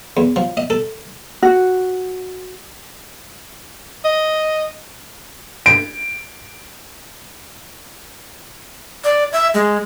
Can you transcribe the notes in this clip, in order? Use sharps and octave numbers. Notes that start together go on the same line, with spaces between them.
E2
F3
D#5
A4
F#4
D#5
D7
D5
E5
G#3